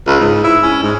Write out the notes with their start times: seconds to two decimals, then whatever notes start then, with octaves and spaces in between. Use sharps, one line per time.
0.07 C#2
0.20 G#2
0.44 E4
0.63 C#4
0.83 G#2